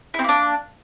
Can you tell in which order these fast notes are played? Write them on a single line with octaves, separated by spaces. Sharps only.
E4 C4 A#3 D4